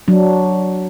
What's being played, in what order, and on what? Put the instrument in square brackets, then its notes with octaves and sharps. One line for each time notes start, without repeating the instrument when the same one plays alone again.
[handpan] F#3 D4